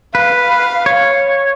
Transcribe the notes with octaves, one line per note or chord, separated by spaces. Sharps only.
B4 F5
C#5